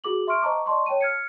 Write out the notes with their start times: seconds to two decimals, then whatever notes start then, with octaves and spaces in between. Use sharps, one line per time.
0.04 F#4 G#4 D6 F#7
0.27 E5 C6 C#6 F6 D7
0.42 C5 D#5 A5 A#5 C#6 D6
0.66 D5 D#5 A5 C6 C#6
0.86 C#5 G5 A5 D#7
1.01 F6 G#6 C#7